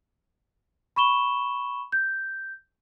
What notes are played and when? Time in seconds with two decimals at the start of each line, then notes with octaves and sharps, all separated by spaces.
0.96 B5 C#6 E7 G7
1.92 G6